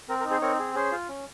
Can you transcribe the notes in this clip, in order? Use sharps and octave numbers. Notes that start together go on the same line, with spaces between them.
C4 A#4
A#4
D#4
G#4 C5
C4 A#4 C#5
G#4
C#4 G#4 C5
F4
C#4